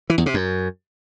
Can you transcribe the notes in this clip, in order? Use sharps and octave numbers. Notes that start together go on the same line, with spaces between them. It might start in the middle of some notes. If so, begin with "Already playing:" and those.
E3
E2
C3
F#2